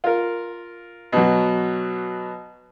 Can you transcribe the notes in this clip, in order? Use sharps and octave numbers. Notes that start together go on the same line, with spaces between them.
F4 A#4
B2 F#3